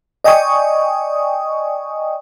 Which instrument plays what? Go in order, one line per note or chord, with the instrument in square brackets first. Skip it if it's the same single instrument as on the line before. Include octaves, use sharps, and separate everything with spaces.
[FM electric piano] D5 D#5 G5 G#5 C#6 D#6